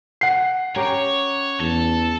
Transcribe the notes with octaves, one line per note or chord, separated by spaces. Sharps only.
F#5 C7
C#4 G4 A#4 C#5
E2 A4